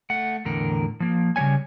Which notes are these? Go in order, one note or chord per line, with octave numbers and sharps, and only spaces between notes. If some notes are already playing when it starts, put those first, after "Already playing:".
A3 F#5
E2 A2 D3 A#4
F3 A#3
C#3 G3 G#3 C#5 G#5